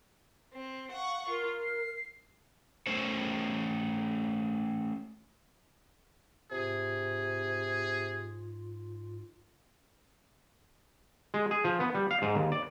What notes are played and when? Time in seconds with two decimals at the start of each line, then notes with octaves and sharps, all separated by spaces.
0.53 C4
0.91 F5 F#5 C#6
1.29 F4 A#4
1.60 C7
2.87 A3 C#4 C5 C#5
6.51 G#2 C3 F4 G#4
11.34 G#3
11.51 G#4
11.64 F3
11.80 B3
11.94 G3
12.11 F5
12.22 G#2
12.36 D#2
12.52 D5